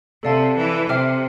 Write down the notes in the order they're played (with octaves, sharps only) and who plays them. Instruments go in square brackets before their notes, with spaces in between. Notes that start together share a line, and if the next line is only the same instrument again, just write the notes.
[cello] C3 [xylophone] A4 D5 F5 A5 E6
[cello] E3
[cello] C3 [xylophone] C5 E5 G5 D6 F6